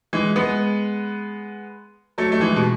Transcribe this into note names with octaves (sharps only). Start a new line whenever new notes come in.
E3 G#3
G#3 B3
F#3 A3
A3
E3 G#3
B2